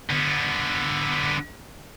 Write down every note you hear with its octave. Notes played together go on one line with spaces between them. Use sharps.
D3 B3